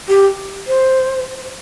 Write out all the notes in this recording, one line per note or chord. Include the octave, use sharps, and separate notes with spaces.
G4
C5